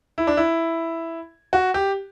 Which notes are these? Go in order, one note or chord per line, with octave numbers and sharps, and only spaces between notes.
E4
D4
E4
F#4
G4